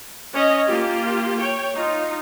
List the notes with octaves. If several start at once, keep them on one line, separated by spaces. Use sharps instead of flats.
C#4 C#5 D#5
A#3 F4 G4
C#5 G5
D#4 F4